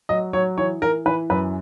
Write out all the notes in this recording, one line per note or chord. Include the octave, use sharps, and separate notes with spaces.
F#3 D#5
F#3 C#5
E3 C#5
E3 A#4
E3 B4
F#2 B4